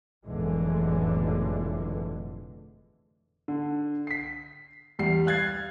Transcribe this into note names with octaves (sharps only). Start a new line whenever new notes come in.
F1 B1 A2 D3 E3 G#3
D3
B6 C7
E2 G3 C7
F5 F#6 G#6 A6 C7